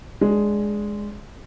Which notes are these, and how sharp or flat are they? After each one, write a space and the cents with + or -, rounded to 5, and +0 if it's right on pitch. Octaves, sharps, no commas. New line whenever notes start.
G#3 +0 D4 -10